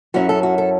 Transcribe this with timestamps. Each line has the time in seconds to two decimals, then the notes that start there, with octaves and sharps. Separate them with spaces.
0.14 F#2 F#3 C#4 E4 F#4
0.29 A4
0.43 F#4
0.58 A4